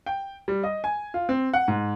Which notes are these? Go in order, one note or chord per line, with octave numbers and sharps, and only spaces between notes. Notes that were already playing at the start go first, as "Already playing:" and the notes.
G5
G3
D#5
G#5
F4
C4
F#5
G#2